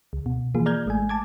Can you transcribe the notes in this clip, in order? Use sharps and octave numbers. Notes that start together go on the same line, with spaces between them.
C#2
B2
E3 F3 A#3 F4 G#4
D5 A#5 F6 G6 G#6
G#1 G#3 A3 G#5
A5 D6 G#6